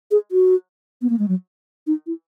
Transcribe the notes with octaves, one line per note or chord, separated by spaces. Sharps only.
G#4
F#4
B3
A#3
G#3
F#3
D#4
E4